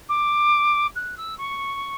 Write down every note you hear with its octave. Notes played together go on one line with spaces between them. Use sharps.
D6
F#6
E6
C#6